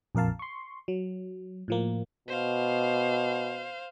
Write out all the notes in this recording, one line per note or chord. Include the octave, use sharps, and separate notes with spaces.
A#1 F2 A#4 F5 A5
C6 C#6
F#3
A2 F3 A#3
B2 C5 F5